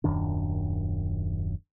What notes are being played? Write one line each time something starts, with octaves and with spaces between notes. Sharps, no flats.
D#1 F#2 D#3 D4